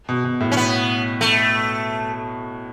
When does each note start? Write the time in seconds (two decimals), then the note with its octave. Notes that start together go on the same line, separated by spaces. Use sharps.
0.09 B2
0.24 B2
0.40 A2
0.52 C#4
0.57 B3
1.21 A3